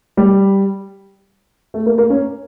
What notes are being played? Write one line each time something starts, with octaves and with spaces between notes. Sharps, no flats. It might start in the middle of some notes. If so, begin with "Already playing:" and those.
G3
A3
A#3
A#3
C#4